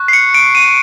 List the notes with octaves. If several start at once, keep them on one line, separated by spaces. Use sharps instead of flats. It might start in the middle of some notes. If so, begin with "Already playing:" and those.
Already playing: C#6 F#6
C7
C#7
D7
D#7